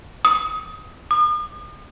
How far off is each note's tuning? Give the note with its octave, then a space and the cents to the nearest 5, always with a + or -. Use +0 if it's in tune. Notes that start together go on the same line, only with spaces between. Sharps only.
D#6 +20
D#6 -45